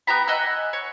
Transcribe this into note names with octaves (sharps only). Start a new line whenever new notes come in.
B3 G4 A#5 B5
D#5 F#5 G#5 E6
C#5